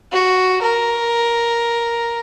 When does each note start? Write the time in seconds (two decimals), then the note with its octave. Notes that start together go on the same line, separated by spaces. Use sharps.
0.12 F#4
0.62 A#4